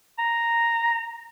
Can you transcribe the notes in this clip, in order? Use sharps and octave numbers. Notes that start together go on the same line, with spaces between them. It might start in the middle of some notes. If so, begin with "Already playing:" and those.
A#5